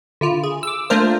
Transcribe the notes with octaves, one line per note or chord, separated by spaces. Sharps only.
D3 E4 F4
G#4
D6 E6
A3 A#3 D4 F4 A#4 C5